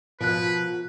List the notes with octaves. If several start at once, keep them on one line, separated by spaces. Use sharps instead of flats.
B2 F3 F4 A#4 B4 F#6